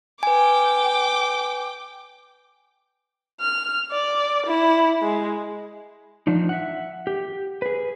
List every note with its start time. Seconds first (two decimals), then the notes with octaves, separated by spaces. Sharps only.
0.23 B4 G5 G#5 D6
3.40 F6
3.91 D5
4.46 E4
5.02 G#3
6.27 F3 D4 D#4
6.49 E5 F#5
7.07 G4
7.62 G#4 B4